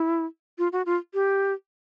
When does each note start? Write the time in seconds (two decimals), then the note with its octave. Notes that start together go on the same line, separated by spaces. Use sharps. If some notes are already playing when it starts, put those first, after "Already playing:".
Already playing: E4
0.58 F4
0.72 F#4
0.86 F4
1.14 G4